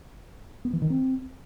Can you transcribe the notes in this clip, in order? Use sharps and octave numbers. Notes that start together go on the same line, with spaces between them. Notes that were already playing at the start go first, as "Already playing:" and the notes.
B3
E3
D#3
C4